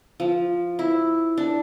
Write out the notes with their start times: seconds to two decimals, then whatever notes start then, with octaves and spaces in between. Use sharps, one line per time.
0.20 F3
0.79 E4
1.38 D4